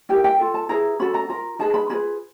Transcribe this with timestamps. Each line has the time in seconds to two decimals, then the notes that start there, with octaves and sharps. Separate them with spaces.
0.09 E4 G4 A#4 G5
0.24 G5
0.39 F4 A4
0.54 A5
0.69 E4 G#4 B4 A#5
0.99 C#4 F#4 A4 B5
1.14 A#5
1.29 F4 A#4 A#5
1.59 D#4 G#4 B4 A5
1.74 B5
1.90 C#4 F4 G#4 B4 B5